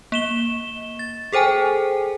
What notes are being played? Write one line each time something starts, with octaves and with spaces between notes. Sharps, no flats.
A#3 E7 G7
A6
G#4 A4 C5 G5 G#5